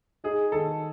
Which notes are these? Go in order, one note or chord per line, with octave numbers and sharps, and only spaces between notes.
D#4 G#4
D#3 A4